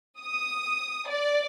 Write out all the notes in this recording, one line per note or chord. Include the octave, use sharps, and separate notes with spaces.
D#6
D5